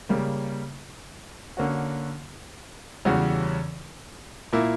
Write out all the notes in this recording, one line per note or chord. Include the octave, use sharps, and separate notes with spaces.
C#3 G3 A#3
D3 A#3 C#4 F#4
E2 C#3 G3 C#4 F#4
A#2 A#3 E4